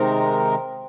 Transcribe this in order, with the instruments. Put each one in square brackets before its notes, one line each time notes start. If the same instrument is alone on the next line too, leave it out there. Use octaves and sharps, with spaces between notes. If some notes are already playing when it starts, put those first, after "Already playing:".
Already playing: [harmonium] C3 D#3 G#3 D#4 A#4 [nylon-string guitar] C4